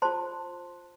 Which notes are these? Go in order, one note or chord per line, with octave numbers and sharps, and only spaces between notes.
F4 C5 A5 C6